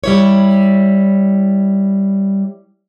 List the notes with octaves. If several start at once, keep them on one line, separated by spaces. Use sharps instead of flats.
G3 E4 C#5